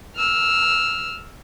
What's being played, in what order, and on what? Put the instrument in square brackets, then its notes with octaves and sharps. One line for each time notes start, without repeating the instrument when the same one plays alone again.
[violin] E6 F6